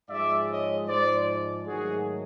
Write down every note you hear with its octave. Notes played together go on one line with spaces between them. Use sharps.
G#2 F3 G#3 D5 E5
C#5 D#5
G#2 F3 G#3 C5 D5
G#2 D#3 F#3 A3 F#4 G#4